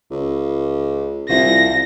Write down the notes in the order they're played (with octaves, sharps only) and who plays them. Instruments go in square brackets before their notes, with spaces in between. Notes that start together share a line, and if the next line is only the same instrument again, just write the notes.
[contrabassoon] C#2
[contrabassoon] C2 [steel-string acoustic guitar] E4 F4 C5 [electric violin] A#6